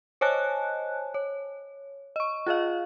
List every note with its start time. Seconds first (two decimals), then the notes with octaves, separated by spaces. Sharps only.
0.21 C5 C#5 D#5 G#5 A5 F#6
1.14 C#5
2.16 D#5 C#6
2.47 F4 G#4 D#5 F5